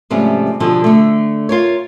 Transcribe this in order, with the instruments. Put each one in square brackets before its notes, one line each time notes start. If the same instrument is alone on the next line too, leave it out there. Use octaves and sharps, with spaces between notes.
[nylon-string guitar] G#2 C3 F3 G3 A3 C#4
B2 D3 F3 G3 A4
D3 A3
F4 A#4 C#5